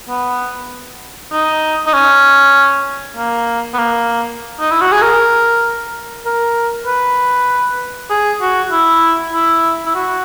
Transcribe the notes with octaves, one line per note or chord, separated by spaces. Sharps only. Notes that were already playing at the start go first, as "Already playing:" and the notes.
B3
D#4
D#4
C#4
A#3
B3
A#3
D#4
E4
F#4
G#4
A#4
A#4
B4
G#4
F#4
E4
E4
E4
F#4